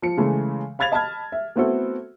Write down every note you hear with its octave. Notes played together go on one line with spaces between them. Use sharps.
F3 C#7
C#3 E3 G#3 A3
F5 B5 G#6 A6 F7
D#5 A5 B5 F6 G#6
E5
A3 B3 C4 E4 F#4 A4